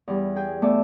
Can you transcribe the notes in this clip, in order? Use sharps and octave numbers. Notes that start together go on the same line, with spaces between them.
E2 G3
G#4 G5 G#5
A3 B3 D5 E5